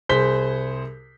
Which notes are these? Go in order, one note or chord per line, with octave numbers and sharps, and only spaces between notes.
C2 G#4 C5 B6 G7